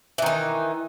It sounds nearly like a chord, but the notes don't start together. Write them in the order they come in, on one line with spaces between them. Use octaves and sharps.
E3 D#3 D#4